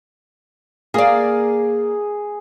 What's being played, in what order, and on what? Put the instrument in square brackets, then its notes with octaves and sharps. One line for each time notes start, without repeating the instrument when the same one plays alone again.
[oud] A#3 D5 [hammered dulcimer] G#4